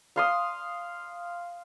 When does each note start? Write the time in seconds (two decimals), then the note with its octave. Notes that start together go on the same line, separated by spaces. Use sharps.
0.16 F5 C6 D#6